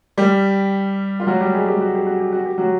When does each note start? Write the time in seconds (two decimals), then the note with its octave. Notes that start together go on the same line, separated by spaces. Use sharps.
0.18 G3 G4
1.20 F4
1.27 F#3 F#4
1.40 G3 G4
1.54 G#3 G#4
1.68 G3 G4
1.81 F#4
1.95 G4
2.07 F#4
2.20 G4
2.32 F#4
2.46 G4
2.58 F#3 F#4